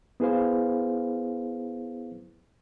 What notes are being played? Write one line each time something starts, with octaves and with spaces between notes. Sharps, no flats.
B3 E4 G#4 B4 C5 F5